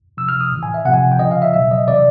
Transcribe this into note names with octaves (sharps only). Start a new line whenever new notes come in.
C3 F3 E6
F6
D#6
A2 E3
G#5
E5
C3 F3 F#5 G#5
G5
C#3 F3 D#5
F5
E5
B2 F#3 E5
D#5
C3 E3 D5